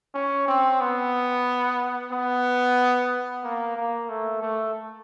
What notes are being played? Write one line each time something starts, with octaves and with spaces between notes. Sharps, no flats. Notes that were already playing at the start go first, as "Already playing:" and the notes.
C#4
C4
B3
B3
A#3
A#3
A3
A3